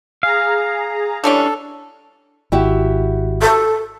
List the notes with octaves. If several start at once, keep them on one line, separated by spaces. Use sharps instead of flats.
G#4 F5 A#5
E3 G3 C#4 D4 A4
G#1 E4 F#4 G4
A4